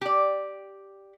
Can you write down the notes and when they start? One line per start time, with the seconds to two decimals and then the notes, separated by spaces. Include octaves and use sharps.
0.01 G4 D5